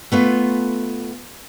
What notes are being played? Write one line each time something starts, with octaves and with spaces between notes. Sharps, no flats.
A3 B3 F4